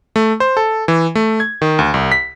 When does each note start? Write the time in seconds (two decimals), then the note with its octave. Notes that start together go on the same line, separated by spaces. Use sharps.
0.16 A3
0.40 C5
0.57 A4
0.88 E3
1.15 A3
1.40 G#6
1.62 D#3
1.79 D2
1.94 C2
2.12 B6